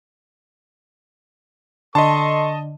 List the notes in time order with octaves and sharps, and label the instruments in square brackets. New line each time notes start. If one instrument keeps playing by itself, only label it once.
[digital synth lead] D3 [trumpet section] A4 C6 C#6 [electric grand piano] D#5 A5